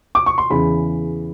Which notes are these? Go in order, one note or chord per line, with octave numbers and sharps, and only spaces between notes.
D6
C#6
C6
E2 C#3 E3 B5